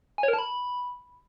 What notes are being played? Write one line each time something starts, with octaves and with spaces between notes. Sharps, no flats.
G#5
C#5
A#4
A5
B5